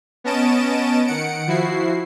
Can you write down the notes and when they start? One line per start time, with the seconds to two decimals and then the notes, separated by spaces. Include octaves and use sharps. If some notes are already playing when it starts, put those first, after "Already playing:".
0.24 B3 C#4 D#5 A5 D7 E7
1.06 D#3 F#5 C#7 D7
1.47 F3 E4 F#4 C7